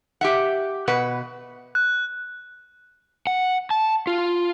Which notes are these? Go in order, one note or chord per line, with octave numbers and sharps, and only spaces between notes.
G4 E5 F#5
B2 B4 F#5
F#6
F#5
A5
F4